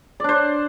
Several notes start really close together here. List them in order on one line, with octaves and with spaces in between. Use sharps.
D5 D4 C5